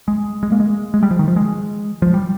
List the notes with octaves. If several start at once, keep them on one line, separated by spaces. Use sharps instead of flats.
G#3
G#3
A#3
G#3
G#3
G3
F3
D#3
F3
G#3
F3
G3